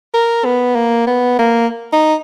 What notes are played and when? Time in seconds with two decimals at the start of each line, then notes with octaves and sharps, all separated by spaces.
0.14 A#4
0.45 B3
0.75 A#3
1.07 B3
1.39 A#3
1.93 D#4